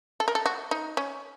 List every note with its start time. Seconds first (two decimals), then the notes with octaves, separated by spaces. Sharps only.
0.20 A4
0.28 A#4
0.35 A4
0.46 F#4
0.71 D#4
0.97 C#4